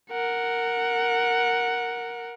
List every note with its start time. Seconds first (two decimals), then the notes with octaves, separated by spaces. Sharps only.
0.11 A#4 F#5